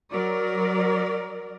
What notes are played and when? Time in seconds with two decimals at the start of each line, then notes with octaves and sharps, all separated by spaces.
0.12 F#3 A#4 D5